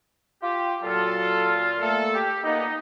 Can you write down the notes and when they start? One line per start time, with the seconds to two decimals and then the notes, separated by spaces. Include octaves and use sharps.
0.42 F4 G4
0.83 A#2 F#3 F4 A4
1.79 A3 A#3 A4
2.13 G4
2.44 A#2 A#3 B3 D#4